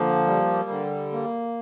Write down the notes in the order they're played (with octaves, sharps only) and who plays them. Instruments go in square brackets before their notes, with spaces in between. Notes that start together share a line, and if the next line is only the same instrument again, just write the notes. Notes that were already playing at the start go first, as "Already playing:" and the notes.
Already playing: [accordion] D3 A#3 [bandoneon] F3
[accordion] G3
D3
A#3